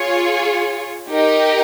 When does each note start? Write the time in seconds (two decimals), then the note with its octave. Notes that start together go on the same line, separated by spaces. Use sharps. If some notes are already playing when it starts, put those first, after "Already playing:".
Already playing: F4 G#4 C#5
1.11 D#4 G4 A#4 D#5